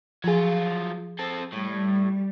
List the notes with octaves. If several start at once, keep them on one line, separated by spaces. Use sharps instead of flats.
F3 F#3 F4 G#4
C4 A4
A2 G3